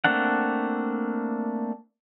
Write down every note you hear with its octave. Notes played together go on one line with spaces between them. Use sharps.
A3 A#3 C4 D4 F#5